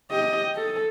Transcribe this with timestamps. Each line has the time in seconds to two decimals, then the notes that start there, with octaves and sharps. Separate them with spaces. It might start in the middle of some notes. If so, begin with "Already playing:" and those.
0.11 G4 D#5
0.56 A4